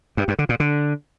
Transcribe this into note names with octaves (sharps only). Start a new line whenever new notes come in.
G2
G2
D3
A#2
D3